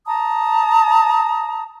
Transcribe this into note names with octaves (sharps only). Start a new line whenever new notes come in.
A5 A#5 D#6